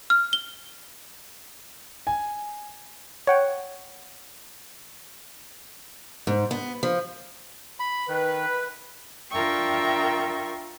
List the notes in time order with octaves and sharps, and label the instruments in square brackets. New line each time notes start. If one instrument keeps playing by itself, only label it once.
[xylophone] F6
G7
[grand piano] G#5
[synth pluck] C#5 F#5 G5
[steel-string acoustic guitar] G#2
B3
F3
[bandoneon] B5
[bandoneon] D#3 [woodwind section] B4
[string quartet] D4 F4 A#4 E5 G5 C#6